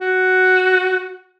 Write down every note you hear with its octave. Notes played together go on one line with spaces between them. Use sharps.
F#4